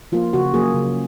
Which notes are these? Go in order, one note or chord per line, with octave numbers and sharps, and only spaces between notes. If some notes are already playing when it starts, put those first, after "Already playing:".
F3 A#3 F4
C#3 F#4
F#3 A#3 G#4
C#3